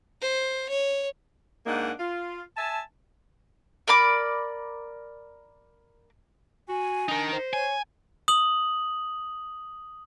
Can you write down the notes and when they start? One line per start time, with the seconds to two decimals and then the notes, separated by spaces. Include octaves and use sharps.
0.21 C5
0.69 C#5
1.66 G#2 A#3 D4 D#4 F#5
1.99 F4
2.57 E5 G#5 A5
3.88 A#4 D5 B5 D6
6.69 F#4 G#5
7.08 D4 D#4 A#4
7.33 C5
7.53 C#5 G#5
8.28 D#6 F#7